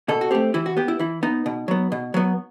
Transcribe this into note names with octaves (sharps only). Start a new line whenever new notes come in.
B2 A4
F#4
A3 C4 G4
E3 E4
F#4
B3 G4
E4
E3 E4
B3 D#4
B2
F#3 B3
B2
F#3 B3